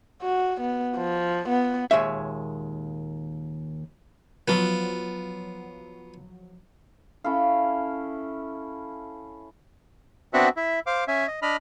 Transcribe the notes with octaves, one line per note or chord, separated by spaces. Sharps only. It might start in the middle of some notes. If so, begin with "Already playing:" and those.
F#4
B3
F3
B3
D#2 A#2 G#3 C#5 E5
F3 F#3 B3 F4
C#4 E4 A4 F5
B3 C4 D4 F#4 E5 F#5
E4 E5
C5 F5 D6
C#4 E5 G#5
D#5
D4 D#5 B5 F6